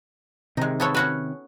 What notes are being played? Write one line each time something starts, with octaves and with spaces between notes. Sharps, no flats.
C3 D#3 G#3 D#4
B3 A4 C#5
C#4 F#4 B4